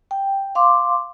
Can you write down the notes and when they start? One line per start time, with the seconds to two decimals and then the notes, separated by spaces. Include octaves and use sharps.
0.11 G5
0.55 F5 C6 D6